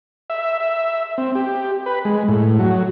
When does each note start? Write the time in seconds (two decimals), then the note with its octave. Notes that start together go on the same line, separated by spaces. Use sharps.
0.30 E5
0.60 E5
1.18 C4
1.35 G4
1.86 B4
2.05 G#3
2.28 A2
2.59 F#3